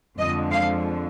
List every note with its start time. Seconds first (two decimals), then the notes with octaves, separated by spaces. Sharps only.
0.18 F2 D3 F3 G#3 D#5
0.50 F5